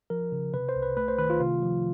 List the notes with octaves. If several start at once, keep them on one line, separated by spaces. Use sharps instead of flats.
F3 A#4
C#3
C3 B4
C5
C2
B4
A3 B4
C5
D#3 B4
F4
C3 F4
F3